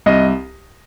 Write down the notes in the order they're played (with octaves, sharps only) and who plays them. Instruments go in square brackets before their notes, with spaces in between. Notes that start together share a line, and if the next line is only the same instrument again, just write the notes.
[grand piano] C2 D#5